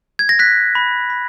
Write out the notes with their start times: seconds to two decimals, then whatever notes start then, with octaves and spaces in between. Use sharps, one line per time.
0.19 G#6
0.29 A#6
0.39 F#6 B6
0.75 B5
1.10 B5